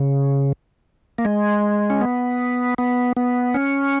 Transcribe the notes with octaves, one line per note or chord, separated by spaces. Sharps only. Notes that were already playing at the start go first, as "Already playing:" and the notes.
Already playing: C#3
A#3
G#3
C#4
B3
B3
B3
C#4